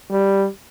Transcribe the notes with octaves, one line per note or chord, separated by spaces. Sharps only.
G3